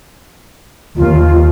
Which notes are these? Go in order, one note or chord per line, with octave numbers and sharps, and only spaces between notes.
D#2 F4